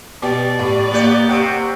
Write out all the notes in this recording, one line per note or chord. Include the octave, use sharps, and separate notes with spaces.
B2 B3 G4 D5
A2 G4
A#3 B3 G4
C3 F#5 G5 C#6